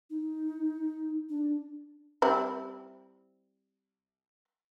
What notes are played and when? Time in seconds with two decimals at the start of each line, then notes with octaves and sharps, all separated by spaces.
0.10 D#4
1.29 D4
2.22 G3 C4 E4